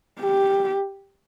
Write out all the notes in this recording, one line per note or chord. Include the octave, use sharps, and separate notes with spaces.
G4